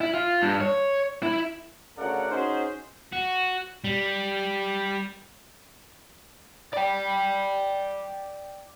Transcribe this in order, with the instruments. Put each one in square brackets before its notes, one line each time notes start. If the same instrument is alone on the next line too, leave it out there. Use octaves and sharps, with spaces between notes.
[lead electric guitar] E4
F4
G2
C#5
E4
[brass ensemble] D2 C#3 A#4 D5 F#5
C#4 D#4 F#4 G#4 C5
[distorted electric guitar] F#4
G3
[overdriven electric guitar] D5 G5